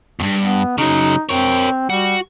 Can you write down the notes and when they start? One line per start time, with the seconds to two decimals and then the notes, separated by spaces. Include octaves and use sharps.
0.20 E2 G2
0.40 B3
0.78 C#3 F#3 D#4
1.29 C4 A#4 C#5
1.90 G3 F#4